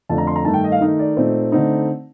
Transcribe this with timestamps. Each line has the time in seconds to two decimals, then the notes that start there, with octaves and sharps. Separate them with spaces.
0.09 F2 D3 F3 A3 D4 A5
0.18 A#5
0.27 C6
0.36 A#5
0.45 G2 D#3 A3 A5
0.54 G5
0.64 D#5
0.72 F5
0.81 D#3 A3 D#4 D#5
0.99 D5
1.17 A#2 A3 C4 D#4
1.52 D3 A3 C4 D#4